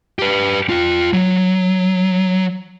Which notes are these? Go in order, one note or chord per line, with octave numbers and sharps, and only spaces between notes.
G4 B4
F4 G5
F#3